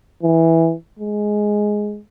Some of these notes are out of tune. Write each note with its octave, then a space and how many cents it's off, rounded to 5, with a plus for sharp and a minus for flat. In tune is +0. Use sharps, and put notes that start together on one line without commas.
E3 -5
G#3 +5